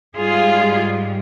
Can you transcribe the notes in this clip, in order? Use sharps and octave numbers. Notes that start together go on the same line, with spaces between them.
G#2 G3 F4 G#4